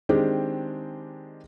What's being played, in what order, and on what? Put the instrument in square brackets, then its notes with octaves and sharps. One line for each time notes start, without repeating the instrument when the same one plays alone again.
[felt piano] D#3 G#3 C4 D4 G4 G#4